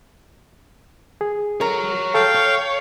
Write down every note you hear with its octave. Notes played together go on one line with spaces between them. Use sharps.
G#4
A#4 C#5 A#5
A4 F5 G5 C#6
C#5